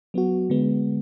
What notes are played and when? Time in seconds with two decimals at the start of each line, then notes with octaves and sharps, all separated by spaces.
0.14 F#3 B3 F#4
0.50 D3 G#3 B3